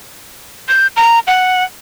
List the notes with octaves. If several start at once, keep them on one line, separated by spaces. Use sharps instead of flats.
G6
A#5
F#5